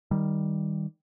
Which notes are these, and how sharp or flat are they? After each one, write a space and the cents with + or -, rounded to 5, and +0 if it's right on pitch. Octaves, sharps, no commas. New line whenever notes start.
D#3 +0 G3 +0